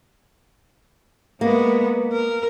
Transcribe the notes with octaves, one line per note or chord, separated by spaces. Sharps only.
G#3 A#3 B3
A#4